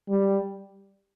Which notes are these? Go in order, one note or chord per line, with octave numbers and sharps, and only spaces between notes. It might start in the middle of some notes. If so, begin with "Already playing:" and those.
G3